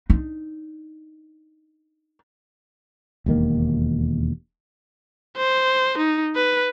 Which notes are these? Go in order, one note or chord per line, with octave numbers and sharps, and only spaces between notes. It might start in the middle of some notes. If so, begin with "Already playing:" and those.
D4 D#4
E1 D#2 D#3 A#3
C5
D#4
B4